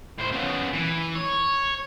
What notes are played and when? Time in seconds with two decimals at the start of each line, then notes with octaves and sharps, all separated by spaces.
0.19 A2 C5
0.33 C#3 B3
0.73 E3
1.15 C#5